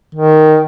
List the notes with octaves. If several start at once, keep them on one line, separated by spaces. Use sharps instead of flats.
D#3